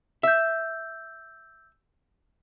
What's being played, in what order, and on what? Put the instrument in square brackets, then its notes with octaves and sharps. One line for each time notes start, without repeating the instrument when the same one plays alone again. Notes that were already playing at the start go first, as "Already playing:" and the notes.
[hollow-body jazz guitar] E5 [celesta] E6 G6